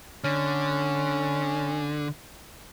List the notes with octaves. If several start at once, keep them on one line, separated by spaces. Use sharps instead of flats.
D3 C#4